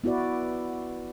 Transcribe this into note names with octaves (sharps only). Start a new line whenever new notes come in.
B3 E4 F#4 B4 D5